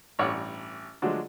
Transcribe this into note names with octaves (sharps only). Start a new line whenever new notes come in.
A1 G2 C#5 D5 F#5
D3 F3 F#3 G#3 A3 D4